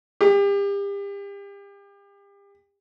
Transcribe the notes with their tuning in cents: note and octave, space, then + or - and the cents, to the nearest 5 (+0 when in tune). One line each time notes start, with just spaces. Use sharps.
G4 +35